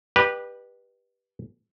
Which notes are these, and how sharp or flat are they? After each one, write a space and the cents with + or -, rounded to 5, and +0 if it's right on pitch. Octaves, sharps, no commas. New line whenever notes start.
G4 +0 B4 -15 D5 +45